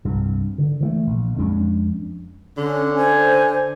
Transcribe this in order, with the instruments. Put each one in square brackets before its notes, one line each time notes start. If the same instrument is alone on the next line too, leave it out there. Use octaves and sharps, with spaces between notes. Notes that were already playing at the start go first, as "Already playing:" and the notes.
[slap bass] C2 G2 C3
D3
E3 F#3 A3
A#1
F2 G#3 C#4 D4
[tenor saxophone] D3 [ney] C#4
[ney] C5 [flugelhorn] G#5